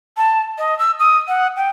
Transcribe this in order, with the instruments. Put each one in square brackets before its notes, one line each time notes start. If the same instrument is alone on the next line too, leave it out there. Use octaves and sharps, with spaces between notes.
[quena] A5
D#5
E6
D#6
F#5
G5